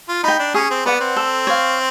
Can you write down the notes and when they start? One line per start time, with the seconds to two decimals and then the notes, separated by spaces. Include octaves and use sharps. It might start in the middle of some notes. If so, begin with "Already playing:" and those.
0.09 F4
0.23 D#4 G5 B5
0.39 D4
0.54 C#4 G#4
0.71 C4
0.85 B3 B4 D5 F#5
1.00 C4
1.16 A4
1.47 C#5 F5